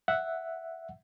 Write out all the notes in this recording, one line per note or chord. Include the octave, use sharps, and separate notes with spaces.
E5 F#5